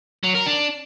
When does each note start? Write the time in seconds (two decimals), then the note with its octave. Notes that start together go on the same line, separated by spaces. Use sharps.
0.23 F#3
0.35 A#4
0.46 D4